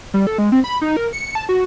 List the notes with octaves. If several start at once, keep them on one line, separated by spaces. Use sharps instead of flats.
G3
A4
G#3
C4
B5
D#4
A#4
C#7
A5
F#4